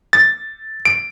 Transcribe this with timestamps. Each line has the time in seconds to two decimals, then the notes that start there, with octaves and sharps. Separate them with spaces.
0.13 A6
0.85 D7